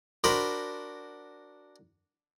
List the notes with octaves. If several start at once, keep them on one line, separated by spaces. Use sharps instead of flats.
D4 F#4 A#4 C5 B5